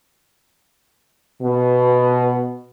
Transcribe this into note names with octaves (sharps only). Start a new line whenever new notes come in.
B2